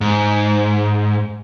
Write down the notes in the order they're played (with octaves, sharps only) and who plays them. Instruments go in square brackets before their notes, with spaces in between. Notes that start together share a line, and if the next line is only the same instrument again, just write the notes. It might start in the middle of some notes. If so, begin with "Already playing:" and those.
[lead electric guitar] G#2